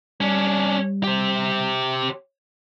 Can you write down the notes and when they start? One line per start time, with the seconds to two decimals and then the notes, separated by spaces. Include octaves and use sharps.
0.21 G3 C#4 D4
1.04 G4 C5